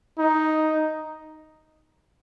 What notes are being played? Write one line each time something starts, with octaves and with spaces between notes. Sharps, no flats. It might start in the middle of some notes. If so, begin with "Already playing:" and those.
D#4